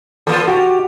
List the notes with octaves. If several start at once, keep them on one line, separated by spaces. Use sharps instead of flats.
E3 A#3 F4 A4
F#4 G4